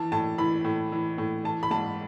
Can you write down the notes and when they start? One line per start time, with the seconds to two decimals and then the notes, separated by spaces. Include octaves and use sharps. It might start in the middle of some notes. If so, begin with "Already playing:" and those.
Already playing: E3 A5
0.12 A2 A5
0.38 E3 B5
0.65 A2
0.92 E3
1.18 A2
1.44 E3 A5
1.63 B5
1.71 G#2 A5